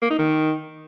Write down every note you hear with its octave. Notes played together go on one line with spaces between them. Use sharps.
A#3
D#4
D#3